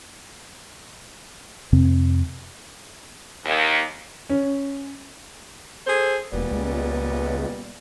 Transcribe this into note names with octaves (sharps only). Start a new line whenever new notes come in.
F2 C3 C4
D#2
C#4
G#4 A4 C5
E1 A#2 G3 B3
C#2